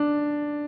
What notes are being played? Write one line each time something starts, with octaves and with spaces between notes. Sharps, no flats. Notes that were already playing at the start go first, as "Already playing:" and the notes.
Already playing: D4